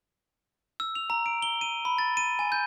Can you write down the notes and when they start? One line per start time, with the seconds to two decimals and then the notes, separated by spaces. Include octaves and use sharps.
0.80 E6
0.95 F7
1.10 A#5
1.26 D7
1.42 G7
1.61 D#7
1.85 B5
1.98 A6
2.17 D#7
2.39 G#5
2.52 G6